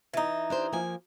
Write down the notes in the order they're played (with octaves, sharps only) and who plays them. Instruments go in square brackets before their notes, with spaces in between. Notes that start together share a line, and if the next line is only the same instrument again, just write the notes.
[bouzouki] E3 D#4
[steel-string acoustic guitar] D4 G4 C5
F3 A#3 G#5